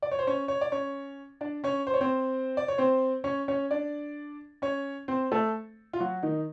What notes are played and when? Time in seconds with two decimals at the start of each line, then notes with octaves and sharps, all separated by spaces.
0.02 D5
0.11 C#5
0.19 C5
0.27 C#4 C#5
0.48 C#5
0.61 D5
0.72 C#4 C#5
1.41 D4 D5
1.64 C#4 C#5
1.87 C5
1.94 C#5
2.01 C4 C5
2.57 D5
2.68 C#5
2.78 C4 C5
3.24 C#4 C#5
3.48 C#4 C#5
3.71 D4 D5
4.62 C#4 C#5
5.08 C4 C5
5.32 A3 A4
5.93 F4
6.00 F#3 F#4
6.23 D#3 D#4